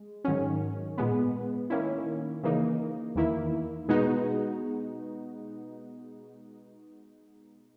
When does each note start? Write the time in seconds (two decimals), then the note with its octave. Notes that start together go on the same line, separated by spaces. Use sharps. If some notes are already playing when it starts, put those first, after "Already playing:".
Already playing: G#3
0.24 G#2 D#3 F#3 C#4
0.98 A#2 G#3 B3
1.70 D#3 A#3 C#4 E4
2.43 C#3 E3 A#3 D#4
3.16 E2 D#3 A#3 E4
3.88 B2 G#3 B3 D#4 F#4